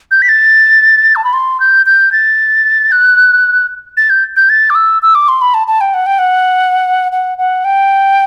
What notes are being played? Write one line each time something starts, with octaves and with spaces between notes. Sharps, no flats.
G6
B6
A6
A5
B5
C6
G6
G6
A6
F#6
A6
G6
G6
A6
D6
E6
E6
D6
C6
B5
A5
A5
G5
F#5
G5
F#5
F#5
F#5
G5